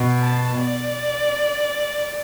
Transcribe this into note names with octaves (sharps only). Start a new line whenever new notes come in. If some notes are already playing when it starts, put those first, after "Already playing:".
Already playing: B2
A5
D5